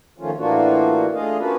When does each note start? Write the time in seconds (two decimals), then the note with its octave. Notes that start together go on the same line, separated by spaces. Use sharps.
0.18 D#3 F3 A3 C#4 F4
0.37 A2 E3 A#3 D4 F4 F#4
1.14 A3 D4 F4 G#4 D#5 F5
1.38 A#3 C#4 D4 F4 F#4 B4